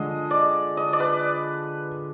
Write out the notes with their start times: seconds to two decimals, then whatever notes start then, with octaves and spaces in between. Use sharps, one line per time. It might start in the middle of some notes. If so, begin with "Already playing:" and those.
Already playing: D3 F3 G#3 D#5
0.31 D5
0.77 D#5
0.93 D5
1.00 B4